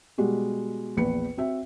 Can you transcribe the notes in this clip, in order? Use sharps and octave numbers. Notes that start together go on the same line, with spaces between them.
B2 G3 G#3 F#4
A#1 E2 B4 C#7
C4 F#4 E5